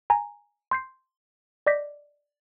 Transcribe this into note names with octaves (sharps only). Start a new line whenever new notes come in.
G#5 A#5
C6 G6 C7
D5 D#5 D6 G6 A#6 B6